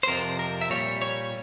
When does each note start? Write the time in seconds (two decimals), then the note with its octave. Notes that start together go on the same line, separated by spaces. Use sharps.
0.03 C5
0.07 F2 C3 F3 A#4
0.39 A#4
0.61 E5
0.70 A#2 G3 C#5
1.02 C#5